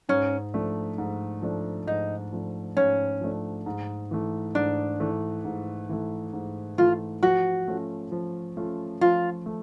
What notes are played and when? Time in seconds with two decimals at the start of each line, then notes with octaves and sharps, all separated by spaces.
0.09 G#2 C#4
0.54 F3 A3 D4
0.98 G#2
1.42 F3 A3 D4
1.87 G#2 D#4
2.33 F3 A3 D4
2.77 G#2 C#4
3.21 F3 A3 D4
3.66 G#2
4.11 E3 A3
4.55 G#2 D4
5.00 E3 A3
5.45 G#2
5.89 E3 A3
6.33 G#2
6.78 E3 A3 F4
7.23 F3 F#4
7.68 A3 C#4 F4
8.12 F3
8.57 A3 C#4 F4
9.01 F3 F4
9.46 A3